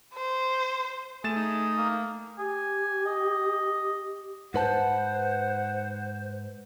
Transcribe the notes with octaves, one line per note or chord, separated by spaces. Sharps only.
C5
A3 G#4 A6 E7
D#4
A#3
G4 G#5
D#5
G#2 B4 C5 F#5 A5